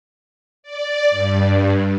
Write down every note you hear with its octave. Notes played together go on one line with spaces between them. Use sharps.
D5
G2